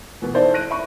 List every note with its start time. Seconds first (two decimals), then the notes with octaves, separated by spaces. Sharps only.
0.22 B2 E3 B3
0.34 C4 D#4 E4 A4 C5 D5
0.54 F#6 A#6 D7 D#7
0.71 E5 B5 C#6